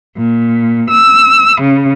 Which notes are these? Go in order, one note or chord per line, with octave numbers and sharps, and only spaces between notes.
A#2
E6
C#3